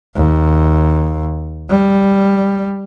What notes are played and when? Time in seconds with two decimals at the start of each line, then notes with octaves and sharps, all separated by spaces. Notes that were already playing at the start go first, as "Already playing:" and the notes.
0.15 D#2
1.70 G3